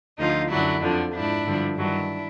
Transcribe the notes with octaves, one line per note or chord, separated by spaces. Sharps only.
D2 D3 F3 D#4 F4
F#2 D3 F#3 D4 E4
F2 D3 F3 D4
G#2 F3 D4 E4
G2 D3 F3
G2 D#3 F#3 D4 E4